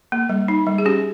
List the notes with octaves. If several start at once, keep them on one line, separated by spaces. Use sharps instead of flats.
A#3
G3
D#4
G3
G#4
C#4 G4